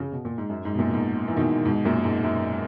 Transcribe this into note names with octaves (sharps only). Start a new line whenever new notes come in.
C#3
B2
A#2
G#2
F#2
G#2
B2
F#2 A#2
G#2 B2
E3
B2 D#3
G#2 B2
F#2 A#2
G#2
F#2